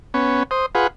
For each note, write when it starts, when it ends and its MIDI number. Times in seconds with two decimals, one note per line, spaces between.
0.14 0.43 59
0.14 0.43 61
0.51 0.66 72
0.51 0.66 87
0.75 0.87 65
0.75 0.87 68
0.75 0.87 71
0.75 0.87 78